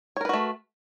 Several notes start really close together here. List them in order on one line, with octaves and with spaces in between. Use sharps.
C#5 A#4 B4 F#4 A3